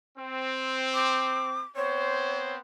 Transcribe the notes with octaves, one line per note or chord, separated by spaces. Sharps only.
C4
D6
B3 C4 C5 C#5